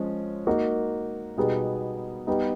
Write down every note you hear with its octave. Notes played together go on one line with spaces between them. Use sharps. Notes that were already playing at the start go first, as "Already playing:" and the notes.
Already playing: F3 G#3 C#4
A#3 D#4 F#4
B2 G3 B3 D#4 G#4
G3 B3 D#4